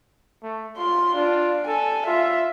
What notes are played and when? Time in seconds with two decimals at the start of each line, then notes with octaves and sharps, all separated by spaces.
0.43 A3
0.78 F4 C6
1.16 D4 F4
1.68 A4 G#5
2.07 F4 E5